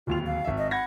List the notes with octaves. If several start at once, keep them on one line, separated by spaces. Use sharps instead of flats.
D1 D#2 F4 F7
F5
G#1 E5
D#5
F#5 B5 G#6 A#6